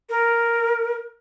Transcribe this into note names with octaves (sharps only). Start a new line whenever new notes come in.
A#4